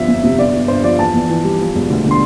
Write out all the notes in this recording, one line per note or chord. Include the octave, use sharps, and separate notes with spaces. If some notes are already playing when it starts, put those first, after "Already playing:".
Already playing: G1 F3 E5
F2
C3
G1 D5
G1
G2 C5
F3 D5
E2 A5
E2
E3
G3
F3
E1
D2
D3
C6